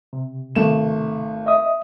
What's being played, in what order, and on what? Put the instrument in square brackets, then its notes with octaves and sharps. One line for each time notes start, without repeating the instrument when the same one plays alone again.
[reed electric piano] C3
[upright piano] G#1 A3 E7
[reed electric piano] D#5 E5 D#6